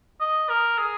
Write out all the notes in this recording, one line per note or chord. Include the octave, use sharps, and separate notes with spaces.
D#5
A#4
G#4